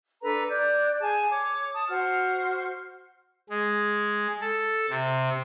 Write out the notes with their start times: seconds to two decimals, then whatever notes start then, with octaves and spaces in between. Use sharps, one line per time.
0.22 D4 A4 B4 A#5
0.50 D5 F#6 G6
1.01 G#4 G#5 A5
1.30 C#5 D6
1.74 A5 D#6
1.89 F#4 C5 F#5 F6
3.50 G#3
4.41 A4
4.90 C3